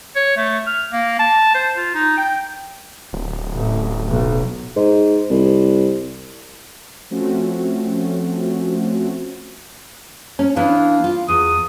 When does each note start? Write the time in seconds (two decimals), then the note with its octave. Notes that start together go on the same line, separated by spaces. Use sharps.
0.16 C#5
0.37 A3
0.67 F6
0.92 A#3
1.19 A5
1.55 C5
1.76 F4
1.94 D#4
2.17 G5
3.13 D1
3.54 A1
4.09 B1
4.76 G#2
5.31 C2
7.10 F3 A3 C4 C#4 F#4
10.39 C#4
10.56 E3 B3 D4 F5
11.04 F4
11.28 E2 D#6